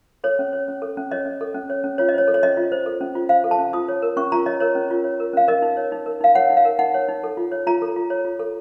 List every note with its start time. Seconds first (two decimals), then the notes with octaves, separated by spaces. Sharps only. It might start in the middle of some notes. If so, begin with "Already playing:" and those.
0.24 A4 C#5
0.39 C#4
0.53 C#5
0.68 C#4
0.82 A4
0.97 C#4
1.11 C#5 D#5
1.25 C#4
1.41 A4
1.55 C#4
1.70 C#5
1.84 C#4
1.98 F4 C#5
2.09 D#5
2.14 C5 C#5
2.28 A4
2.34 C#5
2.43 C#4 D#5
2.57 F4
2.72 C5
2.86 A4
3.01 C#4
3.15 F4
3.29 C5 F5
3.44 A4
3.51 A5
3.59 C#4
3.73 F4 D#6
3.88 C#5
4.02 A#4
4.17 C#4 C#6
4.32 F4 A#5
4.46 C#5 D#5
4.60 A#4 C#5
4.75 C#4
4.91 F4
5.04 C#5
5.20 A#4
5.33 C#4 F5
5.48 A#4 D#5
5.62 D#4
5.77 C#5
5.92 D#4
6.06 A#4
6.21 D#4 F5
6.35 C#5 F#5
6.50 D#4
6.57 F5
6.65 A#4
6.79 D#4 F#5
6.94 C#5
7.08 D#4
7.24 A4
7.37 F4
7.52 C#5
7.67 F4 A#5
7.82 A4
7.96 F4
8.10 C#5
8.25 F4
8.39 A4